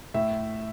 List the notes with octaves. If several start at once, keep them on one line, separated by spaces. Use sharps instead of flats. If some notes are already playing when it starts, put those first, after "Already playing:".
A2 E5